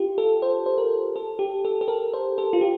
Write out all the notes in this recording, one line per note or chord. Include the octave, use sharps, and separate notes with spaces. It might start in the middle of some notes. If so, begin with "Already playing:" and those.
Already playing: F4 G4
A4
C5
C5
A#4
A4
G4
A4
A4
A#4
C5
A4
F4
G4